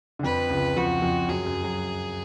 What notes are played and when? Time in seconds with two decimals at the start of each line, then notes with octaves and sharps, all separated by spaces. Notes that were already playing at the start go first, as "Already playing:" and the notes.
0.19 D3
0.23 F2 F3 B4
0.50 C#2 C#3
0.76 F2 F3 F#4
1.02 F2 F3
1.29 F#2 F#3 G#4
1.46 F#2 F#3
1.64 F#3